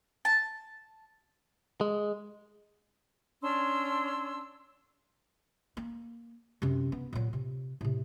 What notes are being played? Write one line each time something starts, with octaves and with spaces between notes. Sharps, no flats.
A5
G#3
C#4 D4 C6 E6
A#3
F#2 C3
B3
A#2 F#3
C3
A2 C3